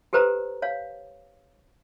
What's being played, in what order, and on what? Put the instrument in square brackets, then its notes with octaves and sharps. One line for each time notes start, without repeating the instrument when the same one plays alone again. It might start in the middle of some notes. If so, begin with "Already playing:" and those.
[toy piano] G4 A4 B4 C5 A#5
C#5 F5